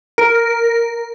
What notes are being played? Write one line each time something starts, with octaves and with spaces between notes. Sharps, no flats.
A#4